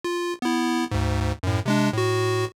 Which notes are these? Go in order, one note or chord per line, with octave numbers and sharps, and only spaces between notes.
F4
B3 E4
D2 G#2
F#2 A2
C3 G#3 D4
A2 F#4